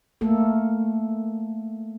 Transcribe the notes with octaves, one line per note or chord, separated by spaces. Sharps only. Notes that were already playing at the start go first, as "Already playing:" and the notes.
A3 A#3 A4